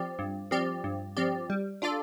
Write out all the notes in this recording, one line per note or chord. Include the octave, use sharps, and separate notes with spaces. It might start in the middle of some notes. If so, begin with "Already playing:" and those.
Already playing: F3 C4 G4 D5
G2
F3 C4 G4 D5
G2
F3 C4 G4 D5
G3
D4 F4 A4 D5